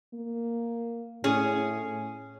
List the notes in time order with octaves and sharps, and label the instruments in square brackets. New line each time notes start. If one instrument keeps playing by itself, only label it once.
[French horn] A#3
[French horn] A2 [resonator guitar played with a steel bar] C#4 G#4